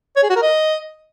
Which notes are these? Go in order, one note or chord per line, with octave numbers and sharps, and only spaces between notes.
C#5
G#4
F#4
A#4
D#5